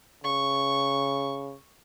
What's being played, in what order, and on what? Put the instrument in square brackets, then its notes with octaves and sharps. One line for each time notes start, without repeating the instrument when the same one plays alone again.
[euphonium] C#3 [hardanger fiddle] C#6